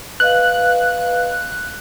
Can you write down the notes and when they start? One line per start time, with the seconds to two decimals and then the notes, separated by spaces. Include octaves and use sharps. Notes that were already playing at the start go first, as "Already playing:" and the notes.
0.20 B4 D#5 F5 F#6